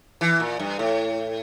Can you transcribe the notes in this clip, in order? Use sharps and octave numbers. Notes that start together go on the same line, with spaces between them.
E3
A#2
G2
A2